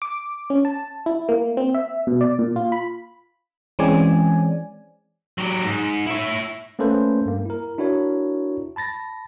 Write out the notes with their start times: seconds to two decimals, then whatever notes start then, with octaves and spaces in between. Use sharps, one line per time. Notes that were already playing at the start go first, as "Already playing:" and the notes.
0.02 D6
0.50 C#4
0.65 A5
1.06 E4
1.29 A#3
1.57 C4
1.74 E5
2.07 B2
2.21 D5
2.39 A#2
2.56 F4
2.72 B5
3.79 E3 G#3 C4 C#4 D5 G#5
5.38 F#3 G4
5.64 G#2
6.06 E4 C#5
6.79 A3 A#3 C#4 A4 B4 C5
7.25 G2 A#3
7.45 E4 A#4
7.78 D4 E4 F#4 A#4 C#5
8.76 A5 B5 A6 A#6